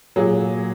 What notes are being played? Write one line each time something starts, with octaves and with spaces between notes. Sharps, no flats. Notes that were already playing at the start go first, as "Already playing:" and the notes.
A#2 F#3 G#4